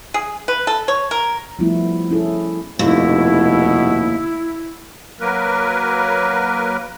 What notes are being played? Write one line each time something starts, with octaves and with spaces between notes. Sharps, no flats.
G#4
B4
A4
C#5
A#4
F3 G3 A3 B3 E4
C#4 E4 G#4 A4
F1 D#2 B2 E4
F#3 A#3 A#4 B4